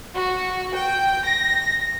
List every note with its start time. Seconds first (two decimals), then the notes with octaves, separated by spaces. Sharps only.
0.15 F#4
0.76 G5
1.26 A#6